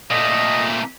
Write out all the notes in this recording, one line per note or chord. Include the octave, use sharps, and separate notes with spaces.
A#2 A3 D#5